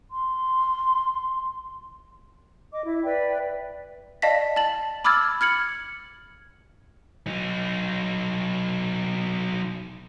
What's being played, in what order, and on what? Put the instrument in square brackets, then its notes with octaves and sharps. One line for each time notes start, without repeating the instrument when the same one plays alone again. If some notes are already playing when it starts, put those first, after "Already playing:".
[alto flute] C6
[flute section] D#5 D6
E4 E5
B4 D5 E5 G5
[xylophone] D5 D#5 F5 A5 A#6 B6
A5 A6 F#7
B5 D6 E6 F6 G#6 A6
F6 G#6 C#7 F#7
[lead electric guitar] F#3 D#4